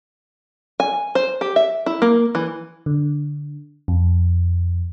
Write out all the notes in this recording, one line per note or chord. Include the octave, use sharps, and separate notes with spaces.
G#5
C5
G4
E5
E4
A#3
E3
D3
F2